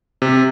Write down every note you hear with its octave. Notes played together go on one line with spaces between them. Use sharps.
C3